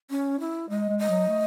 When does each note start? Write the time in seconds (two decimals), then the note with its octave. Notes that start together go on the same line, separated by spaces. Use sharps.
0.10 C#4
0.40 E4
0.69 G#3 D#5
0.89 G#3
0.99 D#5
1.09 F#3
1.28 A3